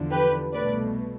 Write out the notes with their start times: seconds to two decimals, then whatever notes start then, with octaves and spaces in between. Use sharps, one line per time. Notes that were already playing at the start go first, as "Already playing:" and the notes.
Already playing: E2 D3 F3
0.11 G4 B4
0.53 C2 B2 A3 B4 D5